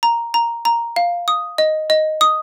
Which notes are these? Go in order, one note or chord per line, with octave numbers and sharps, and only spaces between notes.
A#5
A#5
A#5
F5
D#6
D#5
D#5
D#6